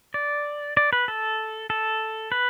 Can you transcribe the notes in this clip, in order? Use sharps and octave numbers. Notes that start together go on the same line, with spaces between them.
D5
D5
B4
A4
A4
B4